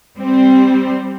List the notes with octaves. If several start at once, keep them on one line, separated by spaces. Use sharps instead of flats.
G3 C4